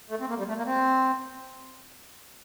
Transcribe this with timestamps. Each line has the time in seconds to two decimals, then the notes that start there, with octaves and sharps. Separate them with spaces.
0.10 A3
0.21 C4
0.29 A#3
0.38 G3
0.48 A3
0.58 A#3
0.66 C4